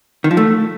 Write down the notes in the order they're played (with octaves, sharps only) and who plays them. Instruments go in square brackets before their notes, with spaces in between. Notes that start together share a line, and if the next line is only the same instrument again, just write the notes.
[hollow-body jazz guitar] D#3
F3
A3